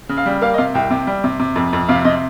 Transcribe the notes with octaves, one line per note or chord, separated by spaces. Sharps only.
C#3
F5
G3
A#3 F5
D#5
C3 F5
C2 G5
C3
G3
C3
C3
F2
F2
C3 F5
C3 D#5